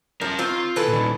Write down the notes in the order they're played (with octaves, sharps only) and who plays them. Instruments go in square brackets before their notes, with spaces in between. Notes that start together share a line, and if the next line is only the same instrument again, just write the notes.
[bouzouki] F3 [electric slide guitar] C#4 A#4
[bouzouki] D#3 A#3 C4 [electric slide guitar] F4
[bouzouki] E3 A4 B4
[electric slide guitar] A#2 D#3